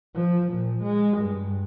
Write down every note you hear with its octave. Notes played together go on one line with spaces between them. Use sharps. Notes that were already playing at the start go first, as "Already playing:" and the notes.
F3
A#2
G#3
G2